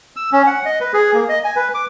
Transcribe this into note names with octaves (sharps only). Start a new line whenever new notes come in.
E6
C#4
F#5
D#5
B4
G#4
A#3
D#5
G#5
B4
D6